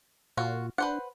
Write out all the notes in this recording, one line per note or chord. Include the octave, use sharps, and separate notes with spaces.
A#2 F4 F#4
D4 B4 C5 F#5